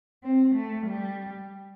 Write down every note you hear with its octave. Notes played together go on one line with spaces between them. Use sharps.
C4
A3
G3